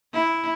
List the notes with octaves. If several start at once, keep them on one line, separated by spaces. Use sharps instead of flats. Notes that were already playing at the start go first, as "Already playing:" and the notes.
E4